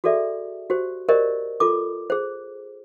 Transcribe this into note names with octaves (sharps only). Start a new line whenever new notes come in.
F#4 G#4 A4 D5 E5
F#4 G4 C5
G4 A#4 C5 D5 D#5
F4 A4 D6
G#4 C5